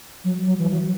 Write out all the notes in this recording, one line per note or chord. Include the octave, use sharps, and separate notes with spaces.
F#3
F#3
E3
F#3